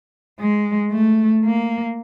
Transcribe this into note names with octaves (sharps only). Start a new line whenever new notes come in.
G#3
A3
A#3